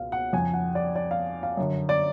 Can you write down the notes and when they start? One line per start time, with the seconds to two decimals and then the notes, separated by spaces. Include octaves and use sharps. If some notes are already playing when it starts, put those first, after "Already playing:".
Already playing: C#2 B2 F5
0.12 F#5
0.33 F2 C#3 G#5
0.54 F#5
0.75 D5
0.96 D5
1.11 F5
1.43 F5
1.57 F#2 D3
1.89 D5